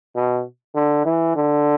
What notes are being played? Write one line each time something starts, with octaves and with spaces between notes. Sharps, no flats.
B2
D3
E3
D3